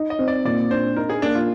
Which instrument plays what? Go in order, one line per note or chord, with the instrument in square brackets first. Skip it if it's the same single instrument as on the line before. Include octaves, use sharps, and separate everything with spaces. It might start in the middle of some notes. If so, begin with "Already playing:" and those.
Already playing: [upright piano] D#4
[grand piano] D#5
[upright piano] C4
[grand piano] D5
[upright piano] A#2 [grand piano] D5
[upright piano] D4 [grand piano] C5
[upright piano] D#4 [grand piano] A#4
[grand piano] G#4
[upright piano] A#3 [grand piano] D4
[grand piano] F4